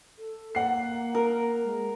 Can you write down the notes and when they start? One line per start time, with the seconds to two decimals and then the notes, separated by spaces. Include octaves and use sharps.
0.18 A4
0.55 A#3 F#5 C7
1.15 A#4
1.64 G#3